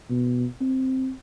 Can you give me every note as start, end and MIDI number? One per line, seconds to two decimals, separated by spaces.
0.10 0.46 47
0.61 1.12 60